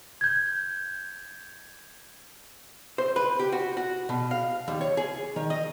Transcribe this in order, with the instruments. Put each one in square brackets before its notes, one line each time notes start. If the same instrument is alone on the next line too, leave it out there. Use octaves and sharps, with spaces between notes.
[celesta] G6 G#6
[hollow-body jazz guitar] C5
B4
G4
F#4
F#4
B2
F5
D#2
C#5
G#4
D#3
D#5